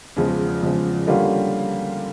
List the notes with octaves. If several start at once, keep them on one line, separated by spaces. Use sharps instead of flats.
E2 C#3 F3 G#3
E2 C#3 F3 G#3
D3 G3 A#3 C#4 F4